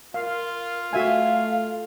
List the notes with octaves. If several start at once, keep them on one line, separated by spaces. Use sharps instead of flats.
F4 A#4 F5
A3 F#4 E5 F5 G#5